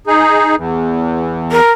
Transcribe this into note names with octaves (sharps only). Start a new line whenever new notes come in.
D#4 G#4
E2
A#4